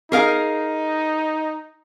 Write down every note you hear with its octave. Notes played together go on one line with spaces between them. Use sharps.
D#4 G#4 A#4 F5